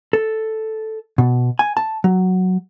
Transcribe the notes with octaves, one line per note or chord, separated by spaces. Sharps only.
A4
B2
G#5
A5
F#3